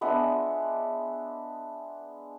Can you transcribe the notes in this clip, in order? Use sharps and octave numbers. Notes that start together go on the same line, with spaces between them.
G#3 B3 D4 E5